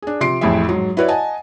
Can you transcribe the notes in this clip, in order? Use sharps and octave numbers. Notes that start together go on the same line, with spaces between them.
D4 G#4
C3 F3 C6 C7 D7
A1 F2 A2 E4 G#4 E5
G#2 F#3
E4 F#4 B4 C#5 D5
D#5 F#5 G#5 A5